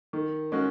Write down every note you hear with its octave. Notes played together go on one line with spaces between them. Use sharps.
D#3
G#3 C#4 F#4